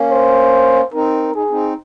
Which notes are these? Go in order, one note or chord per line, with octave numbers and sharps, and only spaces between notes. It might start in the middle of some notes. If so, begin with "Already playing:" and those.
Already playing: A#3 C#4
C5
C4 D#4 A#4
D#4 G#4
C4 D#4